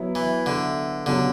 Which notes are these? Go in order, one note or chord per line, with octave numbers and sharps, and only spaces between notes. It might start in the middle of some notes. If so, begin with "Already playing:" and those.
Already playing: F#3 B3 E4 B4
E3
D3
C#2 B2 D3 F#3 C#4 G4